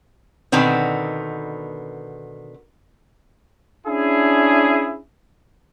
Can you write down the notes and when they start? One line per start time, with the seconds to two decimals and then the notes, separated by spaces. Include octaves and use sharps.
0.52 B2 D3 D#3 B3 C4
3.87 C#4 D4 E4 G#4